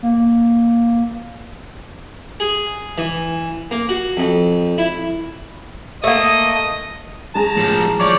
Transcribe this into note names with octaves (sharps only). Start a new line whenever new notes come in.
A#3
G#4
E3
A#3
F#4
F2
E4
A3 A#3 D#5 D#6
G#3 A5 A#5
A2 F3
F3 C#5 D5